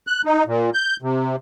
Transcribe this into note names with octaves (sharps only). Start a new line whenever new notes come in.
F#6
D#4
A#2
G6
C3